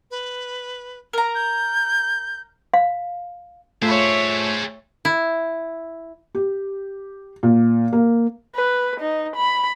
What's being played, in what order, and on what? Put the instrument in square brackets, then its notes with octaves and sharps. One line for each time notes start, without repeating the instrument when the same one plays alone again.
[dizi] B4
[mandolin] A#4 A#5
[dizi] G6
[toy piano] F5
[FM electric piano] A3 F4 A5 [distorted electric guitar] G#4 C5 [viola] C#5 E5
[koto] E4
[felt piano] G4
A#2
A#3
[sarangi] B4
D#4
B5